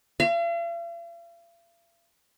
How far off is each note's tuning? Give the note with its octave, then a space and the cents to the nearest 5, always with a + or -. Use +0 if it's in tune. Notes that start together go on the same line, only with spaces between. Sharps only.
F5 -45